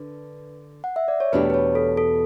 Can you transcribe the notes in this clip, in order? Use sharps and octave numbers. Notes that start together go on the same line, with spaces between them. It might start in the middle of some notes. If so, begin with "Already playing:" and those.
Already playing: D3 D4 B4
F#5
E5
D5
C#5
E2 B2 A3 D4 G4 B4
B4
C#5
A4
A4